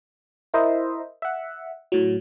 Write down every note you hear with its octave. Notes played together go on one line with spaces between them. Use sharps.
E4 A#4 C5 D#5 E5
E5 F#5
A2 F#3